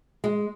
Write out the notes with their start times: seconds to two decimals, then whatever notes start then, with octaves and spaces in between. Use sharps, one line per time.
0.24 G#3